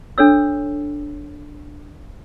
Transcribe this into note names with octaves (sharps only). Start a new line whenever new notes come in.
D4 A4 C#5 E6